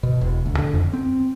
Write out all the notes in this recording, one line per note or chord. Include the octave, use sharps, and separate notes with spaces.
B2
E1
D2
D3
F2
C4